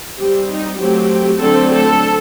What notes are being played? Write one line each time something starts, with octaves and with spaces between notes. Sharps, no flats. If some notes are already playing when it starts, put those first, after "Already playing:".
G3 C4 G4
D#4
F#3 A3 C4 G4
D3 F#3 A3 C4 A4
A4